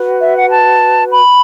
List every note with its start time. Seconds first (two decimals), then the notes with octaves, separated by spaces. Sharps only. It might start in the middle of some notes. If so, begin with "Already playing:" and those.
Already playing: F#4 B4
0.21 E5
0.36 F#5
0.51 A5
1.09 B5